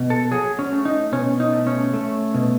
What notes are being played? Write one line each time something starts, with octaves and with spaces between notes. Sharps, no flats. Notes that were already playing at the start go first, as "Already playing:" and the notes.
Already playing: B2
A4
F#3 G#4
C#4
A3
D#4
B2 C#4
D#4
A3
C#4
A3
B2